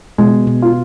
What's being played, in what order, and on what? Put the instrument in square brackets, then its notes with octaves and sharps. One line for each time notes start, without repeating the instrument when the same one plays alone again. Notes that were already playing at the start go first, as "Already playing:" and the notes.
[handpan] B2 [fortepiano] G#3
[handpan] B2
[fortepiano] F4